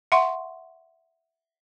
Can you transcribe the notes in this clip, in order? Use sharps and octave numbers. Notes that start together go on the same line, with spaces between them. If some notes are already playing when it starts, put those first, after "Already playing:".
E5 F#5 C6 C#6